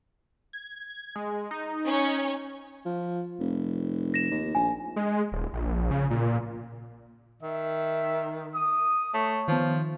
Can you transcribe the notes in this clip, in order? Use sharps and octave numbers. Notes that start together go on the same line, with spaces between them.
G#6
G#3
D#4
C#4 C#5
F3
F1
A#6 E7
D#2
A#1 G#5
G#3
D#1
A#1
C#3
A#2
D#3 E5
D#6
A3 C#5
D#3 F3 B3